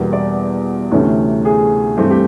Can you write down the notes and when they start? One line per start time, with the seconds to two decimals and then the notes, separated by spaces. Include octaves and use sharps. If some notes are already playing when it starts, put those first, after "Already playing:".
Already playing: E2 B2 G3 A#3
0.13 D5
0.91 D2 C3 E3 A3 C#4
1.45 G#4
1.97 G2 E3 A3 C4 G4
2.10 G4